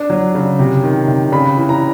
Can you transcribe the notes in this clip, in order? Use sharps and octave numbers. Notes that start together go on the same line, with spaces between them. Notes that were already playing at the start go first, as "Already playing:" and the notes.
Already playing: D4
F#3
C#3
C3
D#3
C3
C#3 B5
E3
A#5